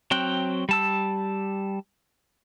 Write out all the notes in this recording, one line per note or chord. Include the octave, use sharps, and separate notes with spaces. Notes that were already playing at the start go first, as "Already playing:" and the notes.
F#3 C4 G5 F#6
G3 A5 E6